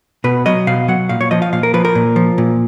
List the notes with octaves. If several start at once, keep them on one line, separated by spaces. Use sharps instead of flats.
B2 B4
F#3 D#5
B2 F5
F#3 F#5
A#2 F5
C#5
F3 D#5
F5
A#2 F5
A#4
F3 B4
A#4
A#2
F3
A#2